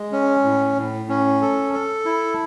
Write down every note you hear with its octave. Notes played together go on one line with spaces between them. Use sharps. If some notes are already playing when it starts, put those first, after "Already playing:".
Already playing: G#3
C#4
A2
A2
C#4
A4
A4
E4